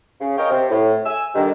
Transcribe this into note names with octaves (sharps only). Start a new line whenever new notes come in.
C#3
A#4 C#5 D#5 F5 G5
C3
A2
G#5 E6
G2 D3 D#3